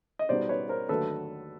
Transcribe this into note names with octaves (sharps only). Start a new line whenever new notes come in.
D#5
B2 G3 B3 D#4 C5 D5
B4 C#5
A#4 C5
D#2 D3 F#3 A3 A4 B4